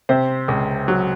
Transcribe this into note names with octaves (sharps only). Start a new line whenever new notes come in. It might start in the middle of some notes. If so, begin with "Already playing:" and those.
C3 C5
C#2
F#3